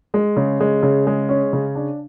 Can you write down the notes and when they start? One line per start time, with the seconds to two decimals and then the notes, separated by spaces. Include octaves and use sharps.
0.14 G#3
0.36 C#3
0.60 G#3
0.83 C#3
1.07 G#3
1.29 C#4
1.53 C#3
1.75 D4